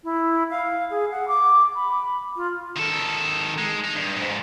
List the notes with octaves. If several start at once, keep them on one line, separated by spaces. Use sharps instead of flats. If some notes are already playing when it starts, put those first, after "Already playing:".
E4
F5
G#4
F#5
D6
B5
F4
D#3 A4
G#3
D#4
G2
F2 G#2